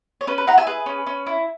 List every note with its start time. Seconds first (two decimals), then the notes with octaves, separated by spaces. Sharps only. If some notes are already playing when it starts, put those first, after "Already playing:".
0.21 C#5
0.27 C#4 B4
0.38 B4
0.47 E4 F#5 A#5
0.58 E5 G#5
0.67 G#4 B4
0.86 C#4
1.06 C#4
1.27 E4